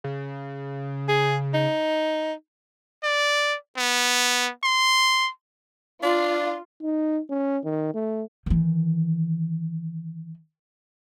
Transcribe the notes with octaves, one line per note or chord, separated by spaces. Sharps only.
C#3
G#4
D#4
D5
B3
C6
D4 F4
D#4
C#4
D#3
A3
D#3 E3